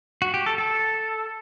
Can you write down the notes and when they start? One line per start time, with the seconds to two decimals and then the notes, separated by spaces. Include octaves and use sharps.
0.22 F#4
0.34 G4
0.46 A4
0.58 A4